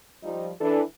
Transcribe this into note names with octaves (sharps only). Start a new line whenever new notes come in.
F3 G3 D#4
E3 D4 A4